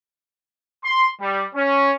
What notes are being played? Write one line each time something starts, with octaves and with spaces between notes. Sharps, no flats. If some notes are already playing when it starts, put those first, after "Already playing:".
C6
G3
C#4